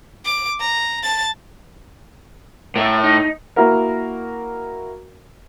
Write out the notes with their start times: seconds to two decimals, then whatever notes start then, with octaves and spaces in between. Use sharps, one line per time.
0.25 D6
0.60 A#5
1.03 A5 A6
2.76 A2 A#4 E5
3.04 D#4
3.56 A#3 E4 F#4 A#4